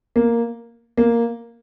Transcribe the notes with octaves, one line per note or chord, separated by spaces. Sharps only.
A#3
A#3